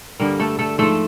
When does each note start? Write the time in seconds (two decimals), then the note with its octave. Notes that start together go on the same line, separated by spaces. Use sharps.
0.20 G2 D3 G3 A#3 A#4
0.40 A3 A4
0.59 A3 A4
0.78 G#2 F3 A3 A4